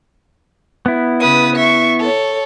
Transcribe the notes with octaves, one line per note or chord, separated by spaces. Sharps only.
B3 E4
C#3 B4 D#6
E5 C#6
A4 C#5